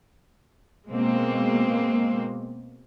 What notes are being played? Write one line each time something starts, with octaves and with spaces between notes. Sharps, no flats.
B2 G#3 A#3 C4